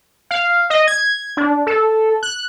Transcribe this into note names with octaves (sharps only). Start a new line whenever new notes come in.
F5
D#5
G#6
D4
A4
F#6